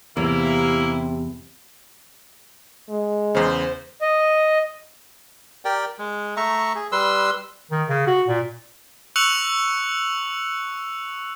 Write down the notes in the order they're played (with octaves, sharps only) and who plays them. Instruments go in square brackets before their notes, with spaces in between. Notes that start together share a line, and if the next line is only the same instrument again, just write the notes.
[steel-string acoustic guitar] E2 [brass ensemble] C3 [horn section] A#3 E4
[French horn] G#3
[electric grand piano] E2 C#3 [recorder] C5
[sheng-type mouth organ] D#5
[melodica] G4 A#4 D5 G5
G#3
A3 E5 A#5 C#6
G#4
G3 B4 C6 E6
[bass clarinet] D#3
C#3
F#4
A#2
[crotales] C#6 E6 F#6 C#7 F7 F#7